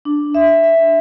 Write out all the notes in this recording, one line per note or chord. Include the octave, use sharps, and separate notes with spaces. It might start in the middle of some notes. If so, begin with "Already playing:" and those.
D4
E5
E5